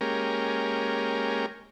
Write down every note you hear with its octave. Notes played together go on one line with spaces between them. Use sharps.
G#3 A#3 C#4 G4 A#4